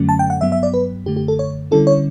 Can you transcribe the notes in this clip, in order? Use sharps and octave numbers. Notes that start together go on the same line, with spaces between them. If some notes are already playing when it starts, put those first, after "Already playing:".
Already playing: F#2 D3 F#3 A3 C#4
A5
G5
F#5
G2 F#3 B3 E5
E5
D5
B4
F#2 D3 A3 G4
G4
A4
C#5
D3 G3 C#4 E4 A4
C#5